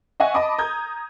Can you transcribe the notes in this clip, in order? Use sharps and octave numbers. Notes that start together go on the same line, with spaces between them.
D#5 E5 F#5 G#5 C#6
D#5 A5 B5 D6 D#6
A#5 D#6 G6 G#6